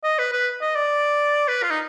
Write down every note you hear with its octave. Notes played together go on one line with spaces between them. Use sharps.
D#5
B4
B4
D#5
D5
B4
F4
D#4